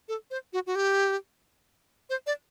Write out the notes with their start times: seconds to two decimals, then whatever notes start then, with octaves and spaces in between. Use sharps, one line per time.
0.08 A4
0.31 C5
0.53 F#4
0.66 F#4
0.75 G4
2.10 C5
2.26 D5